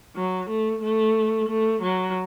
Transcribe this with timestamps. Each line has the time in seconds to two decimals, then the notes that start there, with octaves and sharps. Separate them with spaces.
0.16 F#3
0.50 A3
0.82 A3
1.49 A3
1.82 F#3